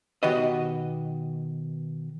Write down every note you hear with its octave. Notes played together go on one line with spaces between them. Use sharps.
B2 D#3 F#4 G4 B4 D#5